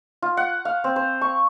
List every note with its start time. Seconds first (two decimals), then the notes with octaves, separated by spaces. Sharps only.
0.22 F4
0.37 F#5
0.65 F5
0.84 C4
0.96 C5
1.21 C#6